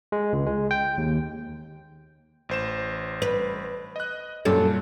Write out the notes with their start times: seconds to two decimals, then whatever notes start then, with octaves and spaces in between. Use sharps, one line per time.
0.12 G#3
0.33 C#2
0.46 G#3
0.71 G5
0.98 D#2
2.49 A1 C5 E7
3.22 B4
3.96 D#5 F#6
4.45 F#2 A#2 G3 C#4 A4